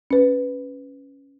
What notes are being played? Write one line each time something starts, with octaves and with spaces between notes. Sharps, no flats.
C#4 B4